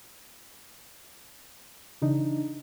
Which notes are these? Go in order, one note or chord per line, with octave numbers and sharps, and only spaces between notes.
C#3 E3 D4 D#4